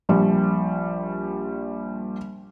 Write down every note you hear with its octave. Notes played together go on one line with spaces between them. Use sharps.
A#1 F3 G3